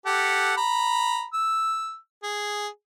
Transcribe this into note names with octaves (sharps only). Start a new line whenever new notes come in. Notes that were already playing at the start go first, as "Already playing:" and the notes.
G4 A4 F#5
A#5 B5
E6
G#4